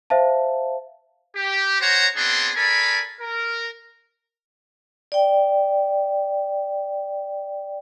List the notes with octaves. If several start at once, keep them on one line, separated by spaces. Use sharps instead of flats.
C5 E5 F5 A5
G4
C5 C#5 F#5 A#5
B3 C4 D4 G#4 C6
A4 A#4 D5 G#5 B5
A#4
D5 G5